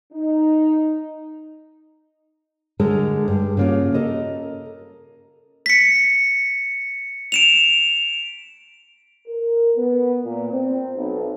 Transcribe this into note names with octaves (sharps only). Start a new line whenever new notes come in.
D#4
D3 G#3 A4 A#4 A5
G2
C#3 A#3 F4
A4 A#4 D#5
B6 C#7
D7 E7 F7
A#4
B3
A#2
C4
B1